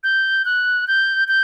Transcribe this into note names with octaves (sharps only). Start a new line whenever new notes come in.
G6
F#6
G6
G6